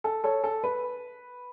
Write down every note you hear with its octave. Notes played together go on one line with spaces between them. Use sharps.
A4
A4 C#5
A4
B4